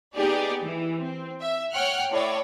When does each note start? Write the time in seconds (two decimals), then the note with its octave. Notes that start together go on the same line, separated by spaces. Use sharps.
0.15 B3 D#4 G4 G#4 D5
0.62 E3
1.00 C4
1.41 E5
1.73 C#5 F#5 G5 F6 F#6
2.12 A2 C#5 D5